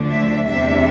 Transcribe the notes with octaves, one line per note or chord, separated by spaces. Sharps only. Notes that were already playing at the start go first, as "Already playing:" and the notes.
Already playing: D2 D3 F3 A3 D4
E5
E2 C3 G3 D4 E5